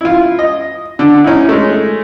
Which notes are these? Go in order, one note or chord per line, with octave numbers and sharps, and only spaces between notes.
E4 F4
D#5
D3
C#4 D#4 E4
G#3 A3